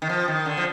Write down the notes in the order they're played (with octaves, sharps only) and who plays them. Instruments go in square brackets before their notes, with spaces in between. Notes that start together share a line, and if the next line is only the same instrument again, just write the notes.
[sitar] D#3
F3
D#3
D3
F3